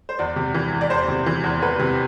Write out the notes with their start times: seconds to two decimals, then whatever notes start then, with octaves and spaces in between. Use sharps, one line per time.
0.09 C5
0.19 E2 D5
0.36 C3
0.54 E3
0.72 E2
0.81 D5
0.90 E2 C5
1.08 C3
1.26 E3
1.44 E2
1.62 E2 B4
1.80 C3